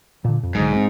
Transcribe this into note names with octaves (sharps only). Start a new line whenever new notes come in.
A#2 D3
F2
B1 G#2 D3
C4